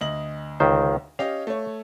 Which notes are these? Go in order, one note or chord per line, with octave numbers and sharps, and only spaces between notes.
D2 D#5 F#7
C#2 D#3 C5
C#4 G4 D#5 F5
A3 C#5